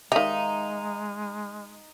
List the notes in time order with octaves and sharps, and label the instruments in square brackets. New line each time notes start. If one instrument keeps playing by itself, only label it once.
[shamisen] D#3 G4 [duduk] G#3 [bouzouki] D#4 [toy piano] E5 F5